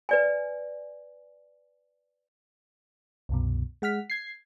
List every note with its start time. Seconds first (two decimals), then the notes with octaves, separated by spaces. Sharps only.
0.09 B4 D5 G#5
3.29 C2 F#2 B2
3.82 G#3 F#5 F6 B6
4.10 G#6 C7